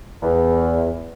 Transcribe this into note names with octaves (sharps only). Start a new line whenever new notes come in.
E2